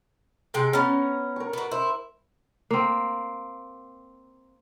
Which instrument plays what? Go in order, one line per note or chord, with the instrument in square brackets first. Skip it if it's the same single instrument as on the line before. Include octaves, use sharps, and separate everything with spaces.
[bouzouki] C3 G#3 G5
[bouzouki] B3 C#4 [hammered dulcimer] A#5
[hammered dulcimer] A#4 C#6
[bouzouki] B3 F#4
[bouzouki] E4 [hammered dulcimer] C5
[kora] A#3 C4